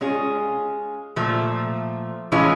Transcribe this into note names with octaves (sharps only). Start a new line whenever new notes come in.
G#3 C#4 F4 G#4
A#2 F3 A3
A2 E3 G#3 C#4 F4